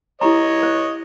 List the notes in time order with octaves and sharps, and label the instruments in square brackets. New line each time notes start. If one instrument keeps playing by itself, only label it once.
[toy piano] E4 G4 A#5 [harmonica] C#5 D#5
[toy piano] C5